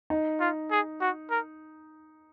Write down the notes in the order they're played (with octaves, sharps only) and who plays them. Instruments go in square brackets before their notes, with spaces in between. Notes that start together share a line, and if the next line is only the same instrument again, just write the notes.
[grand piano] D#4
[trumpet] F4
G#4
F#4
A#4